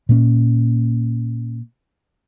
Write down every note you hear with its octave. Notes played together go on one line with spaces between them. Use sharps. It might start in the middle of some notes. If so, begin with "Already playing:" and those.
A#2 A#3 C#4